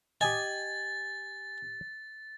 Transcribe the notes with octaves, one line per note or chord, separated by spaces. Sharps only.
G4 D#5 G#5 A6